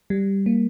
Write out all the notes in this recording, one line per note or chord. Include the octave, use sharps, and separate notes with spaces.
G3
A#3